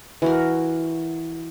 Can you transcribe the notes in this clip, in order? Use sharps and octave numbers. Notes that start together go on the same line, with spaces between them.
E3 F#4 A#4